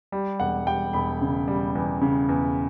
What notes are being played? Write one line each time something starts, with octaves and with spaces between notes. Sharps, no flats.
G3
E1 F#5
G3 G5
E1 B5
C#3
G3
E2
C#3
E2